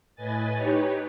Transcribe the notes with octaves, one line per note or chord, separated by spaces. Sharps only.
A2 B4 D#5 G#5 A6
D#4 G4 B4 C#5